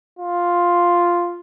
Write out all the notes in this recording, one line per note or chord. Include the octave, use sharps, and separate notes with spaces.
F4